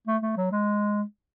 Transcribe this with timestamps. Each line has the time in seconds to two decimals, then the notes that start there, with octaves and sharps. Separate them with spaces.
0.07 A3
0.22 A3
0.37 F#3
0.52 G#3